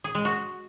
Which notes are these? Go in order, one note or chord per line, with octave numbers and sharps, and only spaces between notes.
G#4
G#3
F#4